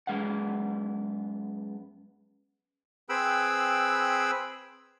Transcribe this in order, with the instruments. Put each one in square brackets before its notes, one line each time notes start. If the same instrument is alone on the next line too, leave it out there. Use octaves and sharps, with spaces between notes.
[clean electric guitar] F#2 D#3 G#3 B3 F5 F#5
[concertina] C4 G#4 B4 G5 B5 E6